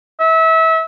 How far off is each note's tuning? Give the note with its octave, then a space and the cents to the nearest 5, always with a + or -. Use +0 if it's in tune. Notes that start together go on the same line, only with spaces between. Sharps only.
E5 -25